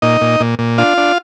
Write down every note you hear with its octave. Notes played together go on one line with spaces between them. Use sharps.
A#2 D#4 D#5
A#2
A#2
A#2
D4 F4 F5
D4